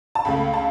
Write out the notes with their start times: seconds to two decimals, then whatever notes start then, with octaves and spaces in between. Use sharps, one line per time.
0.15 A5
0.25 C#2 C#3 A3 B5
0.54 A5